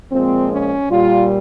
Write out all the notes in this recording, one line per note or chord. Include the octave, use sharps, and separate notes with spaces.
A#2 F3 G#3 C4
C#4
A#2 G3 F4